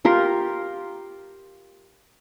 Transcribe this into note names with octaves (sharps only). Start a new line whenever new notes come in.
F4 G4 A#4 C6